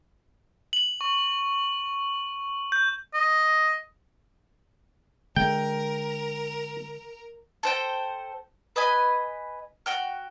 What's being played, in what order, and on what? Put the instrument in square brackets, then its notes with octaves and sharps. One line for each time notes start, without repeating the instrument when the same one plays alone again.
[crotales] F#7
C#6
G6
[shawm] D#5
[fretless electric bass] D3 G#3 [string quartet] A#4 [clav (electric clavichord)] G5
[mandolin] A4 C5 G5
B4 D#5 G#5 B5
F#4 G5 F6